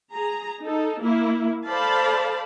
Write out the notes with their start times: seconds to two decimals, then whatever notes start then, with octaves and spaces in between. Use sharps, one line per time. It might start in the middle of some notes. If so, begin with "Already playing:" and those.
0.11 G#4 A#5
0.60 D#4 A4
1.00 A#3 E4
1.67 A4 C5 D5 F5 A5 B5